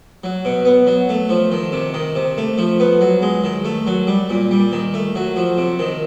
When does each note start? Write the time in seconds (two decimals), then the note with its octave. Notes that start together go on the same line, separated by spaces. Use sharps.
0.24 F#3
0.45 B2
0.65 B3
0.87 F#3
1.09 A3
1.29 F3
1.52 D#3
1.72 C3
1.94 D#3
2.15 C3
2.37 A3
2.58 F3
2.80 B3
3.01 F#3
3.22 G#3
3.44 D#3
3.65 A3
3.87 F#3
4.07 G3
4.30 A#2
4.51 G3
4.72 D#3
4.94 A3
5.15 F#3
5.36 F3
5.58 C3
5.79 D#3